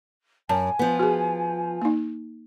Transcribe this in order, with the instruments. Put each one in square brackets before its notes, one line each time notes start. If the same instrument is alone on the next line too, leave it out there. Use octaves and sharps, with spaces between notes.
[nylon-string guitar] F#2 [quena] G#5 [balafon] A5
[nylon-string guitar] F3 B3
[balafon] F#4 G#4
A#3 D#4